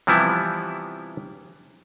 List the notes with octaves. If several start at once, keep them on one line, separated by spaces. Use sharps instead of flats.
C3 E3 F3 G3 B3 E4